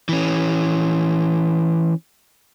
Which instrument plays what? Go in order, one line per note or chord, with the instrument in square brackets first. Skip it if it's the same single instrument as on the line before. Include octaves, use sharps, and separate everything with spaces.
[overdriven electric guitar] E3 C#4